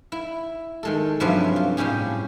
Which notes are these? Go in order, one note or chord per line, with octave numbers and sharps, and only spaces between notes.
E4
D#3 G#3 A4
G2 C3 F3 F#3 C#4 E4
F4
A2 G3 C#4 G4 G#4